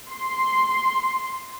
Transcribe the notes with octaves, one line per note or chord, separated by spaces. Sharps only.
C6